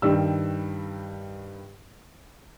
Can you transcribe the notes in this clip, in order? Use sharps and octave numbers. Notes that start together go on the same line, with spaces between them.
G2 D#3 G3 E6